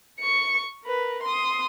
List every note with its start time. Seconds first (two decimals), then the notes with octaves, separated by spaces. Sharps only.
0.20 C#6 C#7
0.84 A#4 B4
1.23 C6 D#6